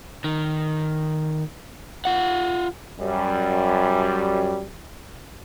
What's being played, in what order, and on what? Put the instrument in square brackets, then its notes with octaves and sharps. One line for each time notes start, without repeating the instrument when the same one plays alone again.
[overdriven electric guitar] D#3
F4 F#5
[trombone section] F#2 G3